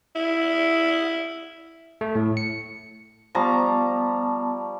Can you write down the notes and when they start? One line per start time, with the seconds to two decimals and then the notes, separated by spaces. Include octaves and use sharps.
0.15 E4
2.01 A3
2.15 A2
2.37 C#7
3.35 F3 G3 B3 A5 A#5 C#6